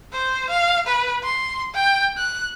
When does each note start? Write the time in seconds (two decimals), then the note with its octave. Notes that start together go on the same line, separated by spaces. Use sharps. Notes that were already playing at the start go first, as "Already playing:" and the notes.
0.13 C5
0.50 F5
0.87 B4
1.23 C6
1.74 G5
2.18 F#6